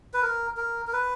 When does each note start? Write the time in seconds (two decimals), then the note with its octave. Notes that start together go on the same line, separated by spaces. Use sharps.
0.14 B4
0.22 A#4
0.57 A#4
0.87 A#4
0.93 B4